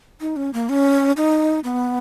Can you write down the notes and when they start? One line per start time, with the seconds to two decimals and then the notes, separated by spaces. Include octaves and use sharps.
0.21 D#4
0.36 C#4
0.53 A#3
0.69 C#4
1.17 D#4
1.64 B3